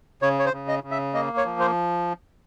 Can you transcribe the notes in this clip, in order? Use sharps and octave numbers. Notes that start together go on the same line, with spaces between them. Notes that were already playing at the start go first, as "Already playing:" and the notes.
C#3 C#5
C#5
C5
C#3
D#5
C#3
E5
A#3 D#5
C#5
F3
C5